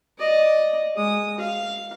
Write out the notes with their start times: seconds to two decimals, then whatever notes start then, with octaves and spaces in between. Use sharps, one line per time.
0.18 D5 D#5
0.96 G#3 D#6
1.38 F5